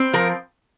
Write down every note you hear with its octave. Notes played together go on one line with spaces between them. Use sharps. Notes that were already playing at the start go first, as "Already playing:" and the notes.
Already playing: C4
F3 A#4